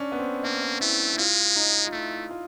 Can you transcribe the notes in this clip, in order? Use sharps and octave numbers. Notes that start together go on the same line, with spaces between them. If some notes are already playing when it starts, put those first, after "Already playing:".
Already playing: C#4 D4
B3
C4
A#3 D4
D4
A3 E4
E4
G#3 F4
D#4
F4
A3 E4
F4